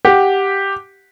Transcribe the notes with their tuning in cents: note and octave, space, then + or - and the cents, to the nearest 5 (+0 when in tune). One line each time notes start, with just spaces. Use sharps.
G4 +0 F#5 +0